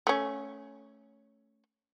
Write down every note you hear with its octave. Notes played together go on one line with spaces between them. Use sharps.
A3 C#4